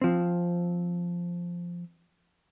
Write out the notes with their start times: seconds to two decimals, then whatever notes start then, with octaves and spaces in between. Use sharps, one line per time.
0.02 F3 C4